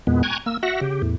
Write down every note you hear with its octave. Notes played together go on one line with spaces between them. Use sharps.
E2 A#2 G#3 B3
G5 G#5 A#5 C#6 F#6 G#6
A#3 E6
F#4 E5 F#5 A#6
C#3 G4
E2 A2